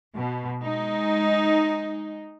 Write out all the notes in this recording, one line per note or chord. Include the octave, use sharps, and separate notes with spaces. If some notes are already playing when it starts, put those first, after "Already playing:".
B2
G#3 D#4